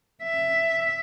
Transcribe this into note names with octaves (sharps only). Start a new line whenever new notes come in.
E5